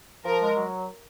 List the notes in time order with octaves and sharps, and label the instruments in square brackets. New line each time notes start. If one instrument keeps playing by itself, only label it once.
[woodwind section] F3 [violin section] A#4
[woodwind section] G#3
F#3